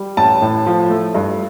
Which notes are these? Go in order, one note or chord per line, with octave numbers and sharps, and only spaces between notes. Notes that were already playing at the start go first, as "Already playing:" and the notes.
Already playing: G3
A1 A5
A2
F3
A3
G2